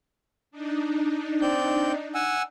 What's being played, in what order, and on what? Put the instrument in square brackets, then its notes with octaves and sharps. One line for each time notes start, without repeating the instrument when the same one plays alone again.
[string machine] D4 D#4
[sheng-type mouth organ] C4 D5 G6
F#5 G#5 E6